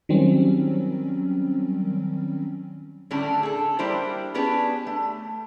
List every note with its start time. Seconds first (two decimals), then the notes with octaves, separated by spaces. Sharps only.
0.09 D#3 F#3 G3 C4 C#4
3.11 A2 D3 G3 C#4 D4 A4
3.43 G#4 A4
3.79 G3 A#3 D4 E4 G4 C5
4.35 B3 C#4 D4 G4 G#4 B4
4.87 A3